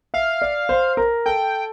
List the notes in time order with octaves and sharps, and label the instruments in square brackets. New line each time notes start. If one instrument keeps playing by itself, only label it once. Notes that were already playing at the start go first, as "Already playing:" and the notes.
[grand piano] E5 [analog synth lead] F5
[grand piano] D5
C5
A#4
[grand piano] A4 [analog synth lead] G5